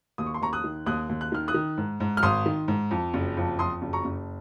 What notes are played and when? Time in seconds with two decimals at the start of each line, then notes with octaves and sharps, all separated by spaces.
0.18 D#2 D#6
0.26 C#6
0.34 C6
0.41 D#2 A#5 C#6
0.53 D#6 F#6
0.64 D#3
0.86 D#2 D#6 F#6
1.09 D#2
1.21 F#6
1.32 D#3 F6
1.48 D#6 F#6
1.54 D#3
1.77 G#2
2.00 G#2
2.17 F6
2.23 G#1 C6 D#6
2.46 D#3
2.68 G#2
2.91 F2
3.14 F#1
3.37 F2
3.59 F2 C6 D#6
3.82 F#1
3.93 A#5 C#6
4.05 F#1